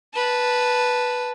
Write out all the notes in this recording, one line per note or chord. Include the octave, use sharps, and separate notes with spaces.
B4 A5